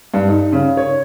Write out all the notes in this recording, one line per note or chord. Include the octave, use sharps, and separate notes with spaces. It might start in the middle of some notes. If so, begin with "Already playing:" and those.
G2
D#4
C#3
C#5